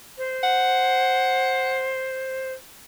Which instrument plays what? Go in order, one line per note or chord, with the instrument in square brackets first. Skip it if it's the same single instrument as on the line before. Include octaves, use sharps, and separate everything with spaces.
[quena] C5
[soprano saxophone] F#5